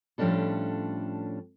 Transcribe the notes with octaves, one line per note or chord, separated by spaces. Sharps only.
A2 F3 G3 C#4 D4 A4